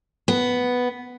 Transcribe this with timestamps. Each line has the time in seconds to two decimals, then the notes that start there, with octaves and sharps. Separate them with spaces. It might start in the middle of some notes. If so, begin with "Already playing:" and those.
0.28 B3